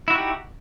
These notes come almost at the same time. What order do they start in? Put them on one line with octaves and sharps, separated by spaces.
E4 F#4 D#4 G4